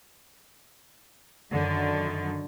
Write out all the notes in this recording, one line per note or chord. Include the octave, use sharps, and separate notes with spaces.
F#2 D3 D#3